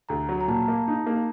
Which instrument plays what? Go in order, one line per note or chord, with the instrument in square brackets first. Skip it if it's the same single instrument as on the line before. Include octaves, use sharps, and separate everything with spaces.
[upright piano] D2 [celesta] A#5
[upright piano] F#3
[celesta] A#5
[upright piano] A#2 [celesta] A5
[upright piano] A#3
D#4
A#3